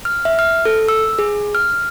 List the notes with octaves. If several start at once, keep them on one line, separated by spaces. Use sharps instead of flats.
F6
E5
F6
A4
E6
G#4
F6